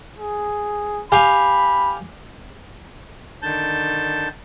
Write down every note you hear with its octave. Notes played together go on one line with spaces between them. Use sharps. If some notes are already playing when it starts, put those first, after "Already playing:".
G#4
G4 F5 G#5 B5
D3 D#3 A5 G6